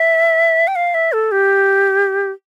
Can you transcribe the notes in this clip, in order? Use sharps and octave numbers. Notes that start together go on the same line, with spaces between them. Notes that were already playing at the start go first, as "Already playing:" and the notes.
Already playing: E5
G5
F5
E5
A4
G4